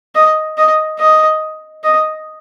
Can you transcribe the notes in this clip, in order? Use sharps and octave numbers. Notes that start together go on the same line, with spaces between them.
D#5
D#5
D#5
D#5